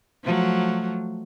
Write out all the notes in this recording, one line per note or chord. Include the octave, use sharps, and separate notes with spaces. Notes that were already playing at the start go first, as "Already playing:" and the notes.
F3 F#3 A3